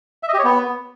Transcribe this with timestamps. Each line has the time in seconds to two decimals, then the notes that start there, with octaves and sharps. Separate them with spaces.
0.23 E5
0.28 D#5
0.34 G4
0.39 C#5
0.44 B3